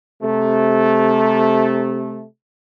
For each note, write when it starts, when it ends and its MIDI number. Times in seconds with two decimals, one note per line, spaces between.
0.22 2.25 48
0.22 2.25 57